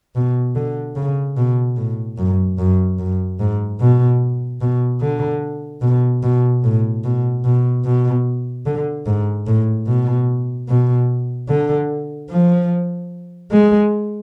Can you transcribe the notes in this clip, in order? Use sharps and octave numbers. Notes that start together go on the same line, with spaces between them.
B2
D3
C#3
B2
A2
F#2
F#2
F#2
G#2
B2
B2
D3
B2
B2
A2
B2
B2
B2
D3
G#2
A2
B2
B2
D3
F3
G#3